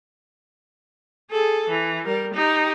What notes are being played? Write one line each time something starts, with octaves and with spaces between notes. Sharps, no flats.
G#4 A4
E3
G3 A#4
D#4 G4